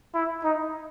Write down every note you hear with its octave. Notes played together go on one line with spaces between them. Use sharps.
E4
D#4